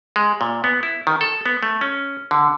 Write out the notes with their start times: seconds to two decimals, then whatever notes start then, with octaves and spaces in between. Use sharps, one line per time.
0.16 G#3
0.41 A#2
0.64 B3
0.83 E4
1.07 D#3
1.21 A4
1.46 B3
1.63 A3
1.81 C#4
2.31 D3